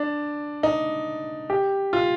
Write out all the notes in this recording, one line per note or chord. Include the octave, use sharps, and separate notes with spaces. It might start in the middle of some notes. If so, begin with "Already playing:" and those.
Already playing: D4
D#4
G4
F4